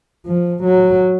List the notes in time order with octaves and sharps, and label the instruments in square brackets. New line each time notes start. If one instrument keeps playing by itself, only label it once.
[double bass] F3
F#3